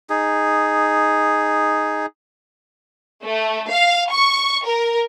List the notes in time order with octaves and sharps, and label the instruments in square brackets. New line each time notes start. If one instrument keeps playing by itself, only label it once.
[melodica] D#4 G#4
[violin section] A3
F5
C#6
A#4